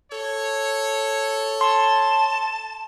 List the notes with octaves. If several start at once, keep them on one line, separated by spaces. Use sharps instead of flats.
A4 C#5
A5 C6